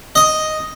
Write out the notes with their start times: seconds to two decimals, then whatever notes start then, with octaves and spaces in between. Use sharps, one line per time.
0.15 D#5